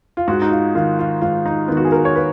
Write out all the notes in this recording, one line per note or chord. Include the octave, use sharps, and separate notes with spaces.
F4
G#2 F#4
D#4
F4
D#3 F4
F4
G#2 F4
D#4
D#3 B3
F#4
G#4
A#4
C#5
B4